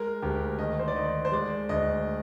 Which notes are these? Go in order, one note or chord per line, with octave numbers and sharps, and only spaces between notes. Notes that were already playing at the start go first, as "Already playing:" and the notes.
Already playing: G#3 A#4
D2 G4
D#3 D#5
C5
D5
D#3 D#5
C5
G#3 D5
D2 D#5